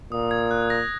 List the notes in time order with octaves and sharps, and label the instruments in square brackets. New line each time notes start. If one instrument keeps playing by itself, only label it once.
[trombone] A#2 [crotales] D#6
[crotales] G#6
F#6
A#6